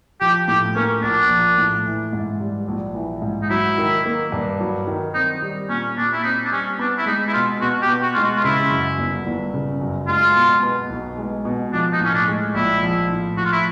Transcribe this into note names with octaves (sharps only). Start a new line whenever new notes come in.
F3 G4
A2 G4
A#3 C#4
A#1 D4
F3
A2
E3
G#2
G3
A#1
E3
G#2
D#4
F#3 E4
D#3
A#3
G2
F#3
D#3
C4 D#4
G3
A#2 C#4
A#2 D4
E4
C4 D#4
D4
G3 C#4
B3 D4
E4
G#3 D#4
E4
B2 F4
B2 F#4
G4
B3
F#4
G#3 F4
F#4
F4
C#3 E4
F#2
G1
G1
C#3
F#2
G#3 F4
B2
B3
B1
G#3
B2
F3 D4
D#4
A2 C#4
D4
G#3
A#1 E4
F3
A2
F3 F#4
F4
E4